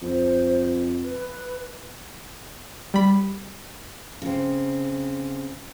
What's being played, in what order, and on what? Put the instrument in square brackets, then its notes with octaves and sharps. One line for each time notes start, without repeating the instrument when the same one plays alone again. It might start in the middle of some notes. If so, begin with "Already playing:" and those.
[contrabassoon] F2 [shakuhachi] C5
[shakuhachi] B4
[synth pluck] G3 B5
[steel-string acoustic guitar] C#3 C4